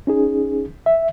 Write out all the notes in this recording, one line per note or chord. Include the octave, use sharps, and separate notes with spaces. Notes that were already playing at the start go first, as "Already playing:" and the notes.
C#4 D#4 G#4
E5